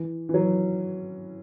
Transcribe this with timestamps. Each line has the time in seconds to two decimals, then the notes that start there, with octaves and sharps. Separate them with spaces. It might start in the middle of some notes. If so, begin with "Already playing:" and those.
Already playing: E3
0.29 E3
0.34 F#3